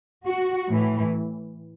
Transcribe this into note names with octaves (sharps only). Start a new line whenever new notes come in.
F#4
A2 E3